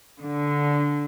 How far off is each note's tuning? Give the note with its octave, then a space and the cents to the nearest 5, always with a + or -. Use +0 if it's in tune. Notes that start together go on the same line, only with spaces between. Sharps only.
D3 -10